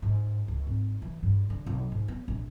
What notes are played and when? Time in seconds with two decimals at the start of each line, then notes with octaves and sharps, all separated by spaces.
0.02 G#2
0.48 C#2
0.67 G#1
1.02 E3
1.23 G2
1.50 D3
1.66 B1
1.92 G#2
2.08 B3
2.28 A#1